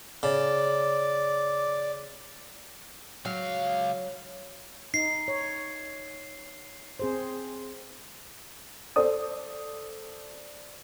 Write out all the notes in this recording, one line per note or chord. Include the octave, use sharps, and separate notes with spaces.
C#3 D5
C#2 F#3 F5
D#4 C7
C#5
C4 G#4 C5
A4 C5 D5 D#6